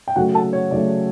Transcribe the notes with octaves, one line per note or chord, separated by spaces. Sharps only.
G5
C#3 F#3 A3 F#4 F#5
A4 A5
C#5
C#3 F#3 A3 D5